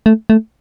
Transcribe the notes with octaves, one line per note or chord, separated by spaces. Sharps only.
A3
A3